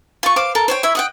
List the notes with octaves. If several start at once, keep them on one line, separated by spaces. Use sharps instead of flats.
F4 C#6
C5 F5 D6
A4 A#4
C5 C#5 G5
E4 C#5 E5
D#5 F#5 G5